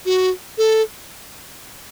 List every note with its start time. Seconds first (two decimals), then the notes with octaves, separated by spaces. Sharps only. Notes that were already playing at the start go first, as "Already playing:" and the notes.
0.06 F#4
0.58 A4